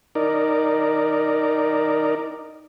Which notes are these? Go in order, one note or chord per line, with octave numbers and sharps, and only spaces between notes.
D#4 A#4 D5